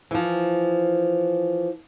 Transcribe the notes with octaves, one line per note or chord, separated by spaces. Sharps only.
E3 F3